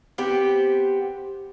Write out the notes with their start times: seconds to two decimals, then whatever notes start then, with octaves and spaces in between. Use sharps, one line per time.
0.18 B3 C4 G4